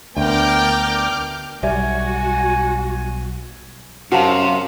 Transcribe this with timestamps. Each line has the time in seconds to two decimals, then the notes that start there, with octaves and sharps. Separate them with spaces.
0.17 D2 B3 D4 A#4 G5 D6 F6 G6
1.63 B1 G3 F#4 D5 E5 G#5
4.12 F#2 C3 F#4 F5 F#5 A5 A#5